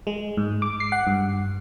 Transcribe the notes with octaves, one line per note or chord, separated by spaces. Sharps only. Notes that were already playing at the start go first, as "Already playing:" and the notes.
G#3
G#2
D6
C7
F#5
G2